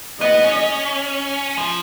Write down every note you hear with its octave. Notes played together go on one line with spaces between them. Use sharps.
B3 D#5
C#4
F3